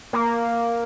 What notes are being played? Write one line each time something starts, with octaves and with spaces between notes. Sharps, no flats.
A#3